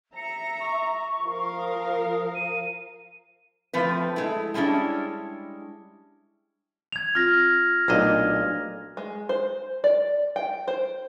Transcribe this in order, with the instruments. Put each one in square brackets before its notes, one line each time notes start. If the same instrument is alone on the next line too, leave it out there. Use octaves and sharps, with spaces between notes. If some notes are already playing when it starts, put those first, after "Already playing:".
[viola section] E5 A#5 [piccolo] C#7
[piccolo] C#6
[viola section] F3 A#4 F5
[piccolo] D#6
D#7
[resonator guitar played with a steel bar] F3 A3 C4 B4
G#3 A3 E4
G3 G#3 C#4 D4 E4
[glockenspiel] G#6 F7
[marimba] C4 F4 [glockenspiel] F6 A#6
[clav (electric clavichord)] B1 A#2 D#5 [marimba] A3 D4
[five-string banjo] G#3
C5
D5
G5
C5